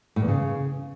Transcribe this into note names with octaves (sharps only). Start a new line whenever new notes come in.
A2
E2
C#3